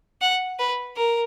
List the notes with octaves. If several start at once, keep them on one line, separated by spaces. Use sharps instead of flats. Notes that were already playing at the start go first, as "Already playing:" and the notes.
F#5
B4
A#4